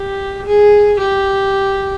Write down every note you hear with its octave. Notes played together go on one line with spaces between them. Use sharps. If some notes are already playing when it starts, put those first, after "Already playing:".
Already playing: G4
G#4
G4